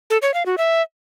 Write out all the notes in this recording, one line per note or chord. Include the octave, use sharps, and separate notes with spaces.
A4
C#5
F5
F#4
E5